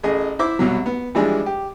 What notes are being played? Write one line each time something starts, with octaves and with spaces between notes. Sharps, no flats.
A1 G#4 D#5
E4 C5 E5 D6
C2 B2 F#3
B3
E3 F3 G3 G#3 D4
G4